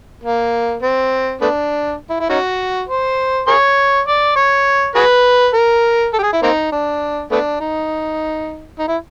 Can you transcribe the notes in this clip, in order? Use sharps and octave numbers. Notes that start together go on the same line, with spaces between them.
A#3
C4
A3 B3 D4
E4
E4
C#4 D#4 F#4
C5
G#4 A#4 C#5
D5
C#5
F#4 G#4 B4
A#4
A4
G4
G#4
E4
A#3 C4 D#4
D4
A3 B3 D4
D#4
D#4
E4